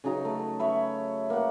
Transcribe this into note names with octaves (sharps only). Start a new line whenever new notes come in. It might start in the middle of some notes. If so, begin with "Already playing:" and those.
C#3 F#3 D#4 A#5
A3
C#5 E5 B5
A#3 F#5